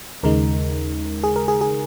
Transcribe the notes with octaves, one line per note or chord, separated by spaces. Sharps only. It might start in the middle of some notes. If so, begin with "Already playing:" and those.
D#2 C#3 G#3 D#4 A#4
G#4
A#4
G#4
G#4